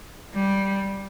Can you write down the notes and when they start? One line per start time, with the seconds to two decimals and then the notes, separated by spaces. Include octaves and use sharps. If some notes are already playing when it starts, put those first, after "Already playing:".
0.34 G3